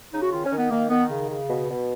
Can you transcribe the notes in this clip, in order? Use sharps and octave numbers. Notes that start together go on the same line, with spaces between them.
C#3 D#4
F#4
D#3 F4
C#4
D#3
B3
D#3 A#3
D#3 B3
C#3
C#3
B2
B2